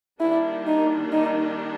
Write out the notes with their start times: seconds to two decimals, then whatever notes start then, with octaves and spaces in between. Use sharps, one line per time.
0.20 D#3 G3 A#3 D4 E4
0.67 D#4
1.12 D#4